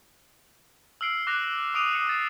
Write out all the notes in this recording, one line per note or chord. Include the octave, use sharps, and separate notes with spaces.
E6 F6 C7 D7
D6 F#6 A#6 F7
D6 D#6 D7 D#7 F7
D#6 C#7 F7
D6 A6 C7